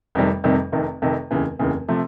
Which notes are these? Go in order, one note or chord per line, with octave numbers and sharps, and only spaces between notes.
F1 F2 C3 D#3 G3
F1 F2 C3 D#3 G3
F1 F2 C3 D#3
F1 F2 C3 D#3
F1 D#2 C#3 E3
F1 D#2 C#3 E3
C3 F3 A3